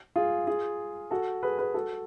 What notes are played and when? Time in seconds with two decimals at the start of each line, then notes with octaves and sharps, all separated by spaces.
0.16 F4 G#4
0.47 F4 G#4
1.11 F#4 A4
1.43 G#4 B4
1.59 G#4 B4
1.74 F#4 A4